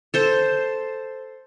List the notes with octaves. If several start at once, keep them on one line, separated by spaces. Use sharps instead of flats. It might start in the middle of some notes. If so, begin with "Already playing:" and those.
A4 C5